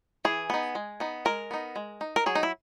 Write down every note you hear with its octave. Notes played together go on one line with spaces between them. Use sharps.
E3 G#4
B3 D#4
G#3
B3 D#4
G#3 A#4
B3 D#4
G#3
D#4
A#4
F#3 G#4
D#4
E4